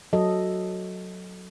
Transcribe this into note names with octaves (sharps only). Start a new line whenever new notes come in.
F#3 A4 D#5